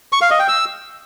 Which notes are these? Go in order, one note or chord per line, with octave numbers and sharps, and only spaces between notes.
C#6
F5
D#5
G5
E6